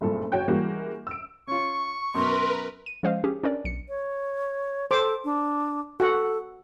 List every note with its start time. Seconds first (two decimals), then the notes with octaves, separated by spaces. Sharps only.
0.01 F#1 C2 G2 A#2 A3 A4
0.32 F#1 F#4 C#5 G5 G6
0.48 E3 G3 G#3 A#3 F#4
1.07 E6 D7
1.48 C#4 F4 C#6
2.14 F#2 B2 A#4 B4 C6
2.86 D#7
3.03 F3 G#3 C#4 C5 D#5 F5
3.24 C#4 G4 G#4
3.43 C#4 D4 A#4 B4 D5
3.65 B1 C#7
3.88 C#5
4.91 A4 C5 D6
5.24 D4
6.00 F#4 A4 F#5